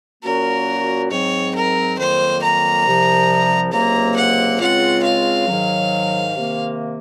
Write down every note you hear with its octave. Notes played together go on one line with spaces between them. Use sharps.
A#2 F#3 A#3 C#4 F#4 A#4
G#2 F#3 C4 C#5
A#4
F2 D#3 F#3 A#3 C5
A#5
C2 C3 F3
C#2 C3 F#3 A#3 A#5
F#5
C#2 C#3 G#3 C4 F4 F#5
F5
G#2 D#3 F#3
C3 D#3 A#3